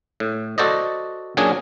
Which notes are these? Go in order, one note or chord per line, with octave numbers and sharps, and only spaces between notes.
A2
F#4 A4 C5 D5 D#5
A#2 F#3 C#4 D4 G#4 G#5